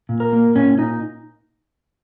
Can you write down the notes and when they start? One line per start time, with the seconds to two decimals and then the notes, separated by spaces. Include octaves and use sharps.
0.09 A#2
0.20 A#4
0.33 A#3
0.56 A#2 C#4
0.78 A#2 D#4